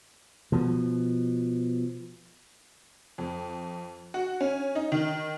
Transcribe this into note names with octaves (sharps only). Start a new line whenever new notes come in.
B2 F3
F2
F#4
C#4
D#4
D#3